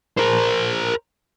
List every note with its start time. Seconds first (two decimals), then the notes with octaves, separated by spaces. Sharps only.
0.17 A#4 C5